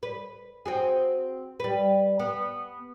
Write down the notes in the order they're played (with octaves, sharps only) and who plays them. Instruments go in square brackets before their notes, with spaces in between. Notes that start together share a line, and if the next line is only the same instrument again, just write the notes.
[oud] B4
C4 F#4 G#4
G3 B4
B3